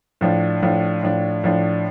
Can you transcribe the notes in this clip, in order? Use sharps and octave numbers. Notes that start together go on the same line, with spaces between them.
A2 F3 D4
A2 F3 D4
A2 F3 D4
A2 F3 D4